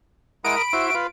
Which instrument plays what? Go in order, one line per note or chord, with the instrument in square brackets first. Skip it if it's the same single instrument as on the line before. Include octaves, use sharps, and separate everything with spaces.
[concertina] G#3 E4 F#5 [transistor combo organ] A#4 D#6 [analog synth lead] D7
[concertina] B5
[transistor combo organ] E4 C5 [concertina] F#4 E5
[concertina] F4 F5 [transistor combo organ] B4